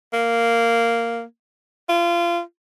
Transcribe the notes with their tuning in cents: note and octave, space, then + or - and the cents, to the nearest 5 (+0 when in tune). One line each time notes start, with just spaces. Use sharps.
A#3 -10
F4 -25